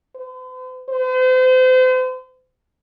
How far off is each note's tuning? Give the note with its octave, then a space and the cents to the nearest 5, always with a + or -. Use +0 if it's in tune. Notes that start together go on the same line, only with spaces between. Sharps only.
C5 -45
C5 -40